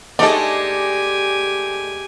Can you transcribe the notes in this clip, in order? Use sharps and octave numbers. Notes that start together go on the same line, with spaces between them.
G#3 A3 D#4 G4 A4 D5 G#5